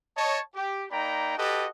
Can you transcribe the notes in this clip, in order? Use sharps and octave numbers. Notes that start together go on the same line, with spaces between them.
C#5 D#5 A5
G4
A#3 D#4 D5 G5 A#5 B5
F#4 G4 A4 B4 D#5 A5